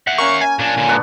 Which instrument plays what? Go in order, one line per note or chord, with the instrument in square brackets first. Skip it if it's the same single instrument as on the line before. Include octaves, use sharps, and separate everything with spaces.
[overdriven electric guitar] E5 F#5
[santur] A#3 C#4 [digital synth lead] C#6
[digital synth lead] G#5
[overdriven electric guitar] A#2 D4
A#2 D3
[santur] B3 D4 F#5